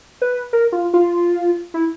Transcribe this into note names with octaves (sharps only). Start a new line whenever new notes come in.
B4
A#4
F4
F4
E4